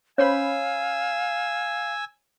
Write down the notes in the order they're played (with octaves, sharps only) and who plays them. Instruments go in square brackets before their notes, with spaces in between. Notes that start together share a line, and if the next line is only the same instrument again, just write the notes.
[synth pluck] C#4 C5 B5 [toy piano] C#5 [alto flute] F5 [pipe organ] G#5 E6